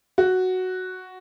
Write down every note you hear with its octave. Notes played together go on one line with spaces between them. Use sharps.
F#4